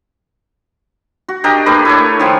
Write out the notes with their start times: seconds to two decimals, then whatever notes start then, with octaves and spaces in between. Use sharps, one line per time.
1.28 F#4
1.44 D4 G4 A#4 D#5
1.66 A3 A#3 D4 B4
1.85 E4 A4 C#5
2.19 D#3 F3 F4 G#5